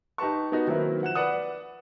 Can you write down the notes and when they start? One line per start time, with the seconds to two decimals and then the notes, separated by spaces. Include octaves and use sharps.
0.18 D#4 G4 B4 A5 C#6
0.52 B3 D#4 F#4
0.67 D#3 F#3 A#3 C4 E4 B4
1.02 F3 F#5 F#6 E7
1.15 B4 D5 F#5 D#6